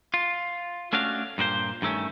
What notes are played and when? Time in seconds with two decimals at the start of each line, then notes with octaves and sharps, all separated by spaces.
0.14 F4
0.93 A3 C#4 D4 F#4 F5
1.38 G2 A#2 F#4 C5
1.82 G2 D#3 A3 C#4